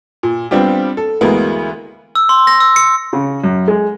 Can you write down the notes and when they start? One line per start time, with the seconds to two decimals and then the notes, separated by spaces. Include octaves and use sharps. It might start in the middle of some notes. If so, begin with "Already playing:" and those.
0.23 A#2
0.51 G3 B3 C4 D4 F4 G4
0.97 A4
1.21 D2 E3 G#3 A#3 B3
2.15 E6
2.29 C6
2.47 A#6
2.60 E6
2.76 C#7
3.13 C#3
3.44 F#2
3.68 G#3